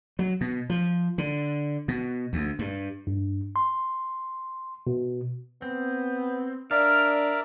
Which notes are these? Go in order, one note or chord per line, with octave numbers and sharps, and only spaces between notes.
F#3
B2
F3
D3
B2
D2
G2
G2
C6
B2
B3 C4
D4 A#4 D5 E5 F5